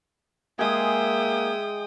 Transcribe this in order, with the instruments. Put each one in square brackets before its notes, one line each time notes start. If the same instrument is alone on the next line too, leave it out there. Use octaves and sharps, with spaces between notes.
[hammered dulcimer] G#3 G#4 [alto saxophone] A#3 [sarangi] E5 [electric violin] G5 D#6